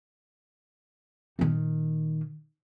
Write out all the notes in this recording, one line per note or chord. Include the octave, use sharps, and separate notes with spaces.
A#2 D#3